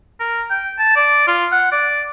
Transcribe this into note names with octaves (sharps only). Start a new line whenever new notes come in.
A#4
G5
A5
D5
F4
F#5
D5